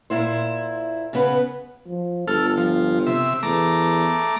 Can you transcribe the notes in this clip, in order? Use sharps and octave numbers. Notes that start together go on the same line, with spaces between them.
A#2 E4 C5
C#3 B3 B4
F3
G1 A4 F6
F3
C3 E5
E2 A3 A#5 D6